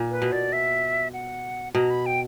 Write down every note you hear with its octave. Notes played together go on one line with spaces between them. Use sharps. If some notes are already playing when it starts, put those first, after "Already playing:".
Already playing: A#2
B4
B2
D5
E5
F#5
B2 A#5
B5
G5